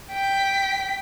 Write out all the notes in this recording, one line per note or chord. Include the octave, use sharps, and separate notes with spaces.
G5 B6